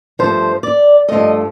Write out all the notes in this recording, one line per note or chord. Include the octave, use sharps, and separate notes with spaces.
G2 F3 A3 C5
D5
G2 F3 A3 D#5